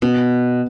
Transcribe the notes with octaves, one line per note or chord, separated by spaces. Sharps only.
B2 B3